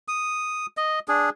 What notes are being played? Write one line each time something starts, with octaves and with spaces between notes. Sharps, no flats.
D#6
D#5
D4 G#4